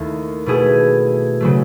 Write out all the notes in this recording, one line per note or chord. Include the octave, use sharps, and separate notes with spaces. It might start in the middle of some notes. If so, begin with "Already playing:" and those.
Already playing: D#2 D#3 A3 E4 A4
B2 A3 E4 G#4
C#3 F#3 A3